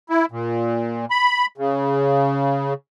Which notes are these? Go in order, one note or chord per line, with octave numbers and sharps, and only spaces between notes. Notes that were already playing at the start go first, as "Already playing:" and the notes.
E4
A#2
B5
C#3